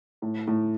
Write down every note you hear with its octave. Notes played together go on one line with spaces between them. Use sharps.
A2
A2